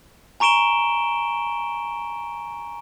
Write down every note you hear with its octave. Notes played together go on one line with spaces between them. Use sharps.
G#5 A#5 C#6 D7 E7 G7